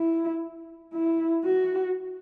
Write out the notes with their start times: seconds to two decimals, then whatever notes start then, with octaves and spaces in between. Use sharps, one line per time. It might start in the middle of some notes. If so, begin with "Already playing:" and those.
Already playing: E4
0.94 E4
1.45 F#4